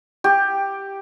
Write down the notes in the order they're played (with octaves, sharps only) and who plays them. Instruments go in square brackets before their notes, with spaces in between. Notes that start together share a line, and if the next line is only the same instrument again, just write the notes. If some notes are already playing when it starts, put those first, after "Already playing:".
[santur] G4